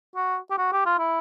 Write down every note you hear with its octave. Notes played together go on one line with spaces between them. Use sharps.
F#4
G4
F#4
G4
F4
E4